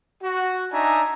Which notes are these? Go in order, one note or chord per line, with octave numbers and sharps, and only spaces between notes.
F#4
D4 D#4 E5 G#5 A#5